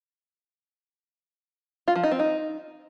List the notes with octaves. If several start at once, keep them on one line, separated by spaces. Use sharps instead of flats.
F4
F3
D#4
C4
D#4